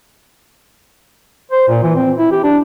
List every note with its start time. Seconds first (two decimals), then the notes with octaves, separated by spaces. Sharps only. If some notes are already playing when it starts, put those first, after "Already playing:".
1.52 C5
1.68 A#2
1.83 E3
1.96 C4
2.18 E4
2.31 G4
2.44 D4